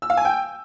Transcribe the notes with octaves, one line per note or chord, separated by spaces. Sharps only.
E6
F5
G#5
G5